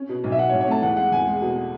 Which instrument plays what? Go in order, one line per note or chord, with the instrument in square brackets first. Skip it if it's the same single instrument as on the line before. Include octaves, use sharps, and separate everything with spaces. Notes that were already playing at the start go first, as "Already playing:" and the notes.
Already playing: [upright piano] C#4
B2
B1
[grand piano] E5
[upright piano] B2 [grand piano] F#5
[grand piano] C#5
[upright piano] B1
[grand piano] C#5
[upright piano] A3 [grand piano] A5
[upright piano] E2 [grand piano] F#5
[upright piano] G#3 [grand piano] F#5
[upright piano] E2 [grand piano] G#5
[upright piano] G#3
B2